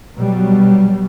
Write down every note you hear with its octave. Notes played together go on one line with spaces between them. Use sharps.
B2 F#3 G3